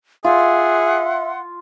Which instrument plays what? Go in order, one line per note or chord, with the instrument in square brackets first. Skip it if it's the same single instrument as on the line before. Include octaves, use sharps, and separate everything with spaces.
[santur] F4 [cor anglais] G#4 [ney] E5 [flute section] F#5 C6